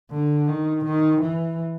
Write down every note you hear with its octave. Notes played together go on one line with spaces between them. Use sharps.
D3
D#3
D#3
E3